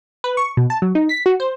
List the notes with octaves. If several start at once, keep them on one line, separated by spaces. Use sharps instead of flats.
B4
C#6
B2
A5
F#3
D#4
B6
F#4
C5